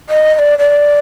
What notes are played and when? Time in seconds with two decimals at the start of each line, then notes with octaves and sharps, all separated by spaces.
0.10 D#5
0.35 D#5
0.39 D5
0.59 D5